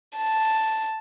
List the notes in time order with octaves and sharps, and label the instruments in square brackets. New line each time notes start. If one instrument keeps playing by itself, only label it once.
[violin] A5